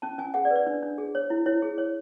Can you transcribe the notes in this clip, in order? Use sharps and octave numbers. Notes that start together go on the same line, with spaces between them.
C#4 A5
C#4 G#5
G#4 F#5
D5
B4
D5
D4
D4
G#4
C#5
E4
E4 C#5
G#4
C#5